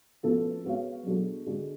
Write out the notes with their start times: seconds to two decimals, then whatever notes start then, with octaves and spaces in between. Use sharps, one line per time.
0.23 F3 A3 B3 C#4 F#4 A4
0.65 G#3 B3 F#4 C#5 F5
1.05 B2 F#3 G#3 D4 F#4 A4
1.46 D3 G#3 D4 F#4